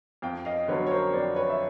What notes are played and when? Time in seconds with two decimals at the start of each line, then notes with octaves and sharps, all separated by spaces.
0.22 F2 F5 G5
0.45 D#5 F5
0.68 D3 F#3 B4 C#5
0.86 C#5
0.91 A#4 C5
1.13 F2 C5 D5
1.36 B4 C#5
1.50 E5